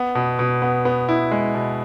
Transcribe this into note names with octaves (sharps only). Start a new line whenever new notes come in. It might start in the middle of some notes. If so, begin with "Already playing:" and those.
Already playing: B3
B2
B2
B3
B3
E4
G#3
B2